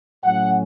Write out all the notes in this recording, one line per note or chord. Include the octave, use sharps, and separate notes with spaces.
A2 F#3 C#4 F#5